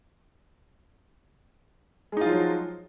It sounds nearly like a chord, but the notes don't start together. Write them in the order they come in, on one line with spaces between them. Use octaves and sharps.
G#3 D#4 F4 F3 F#3